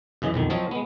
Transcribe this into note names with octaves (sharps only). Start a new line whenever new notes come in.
F#2 C#3 E3 D#5
B1 F2 D#3
F3 F#3 C4 F4 C#5 D#5
G#3 B3